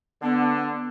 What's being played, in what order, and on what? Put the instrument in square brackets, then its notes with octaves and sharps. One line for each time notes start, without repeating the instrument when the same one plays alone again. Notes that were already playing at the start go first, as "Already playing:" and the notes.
[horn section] D3 [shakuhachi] B3